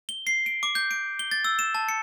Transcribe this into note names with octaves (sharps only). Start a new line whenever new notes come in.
G7
C7
D7
D6
G6
D7
G7
A6
E6
E7
A5
C#7